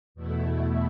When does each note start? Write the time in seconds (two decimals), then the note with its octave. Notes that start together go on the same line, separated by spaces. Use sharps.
0.15 E2 B2 A3 E4